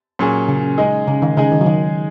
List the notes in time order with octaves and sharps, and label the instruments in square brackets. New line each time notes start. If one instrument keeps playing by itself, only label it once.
[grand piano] A#2 F#3 C#4 G#4
[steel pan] C#3
[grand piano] G#3 D#4 G#4
[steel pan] C#3
D#3
[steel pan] C#3 [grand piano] G#3 D#4 G#4
[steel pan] D#3
F#3
D#3